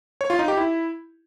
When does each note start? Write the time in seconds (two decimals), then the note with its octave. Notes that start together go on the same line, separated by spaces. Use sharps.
0.21 C#5
0.30 F4
0.39 D#4
0.48 G4
0.57 E4